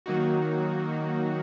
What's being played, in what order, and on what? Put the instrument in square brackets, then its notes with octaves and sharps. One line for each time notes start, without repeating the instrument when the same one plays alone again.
[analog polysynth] D#3 F#3 A#3 D#4 F#4